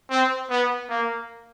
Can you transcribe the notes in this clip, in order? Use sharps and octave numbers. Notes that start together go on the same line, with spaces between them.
C4
B3
A#3